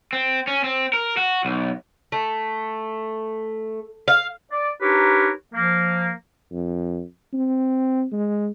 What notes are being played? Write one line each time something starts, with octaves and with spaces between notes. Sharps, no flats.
C4
C#4
C4
A#4
F#4
B1
A3
F5
D5
D4 D#4 G4 A#4 B4 C#5
F3 A#3
F2
C4
G#3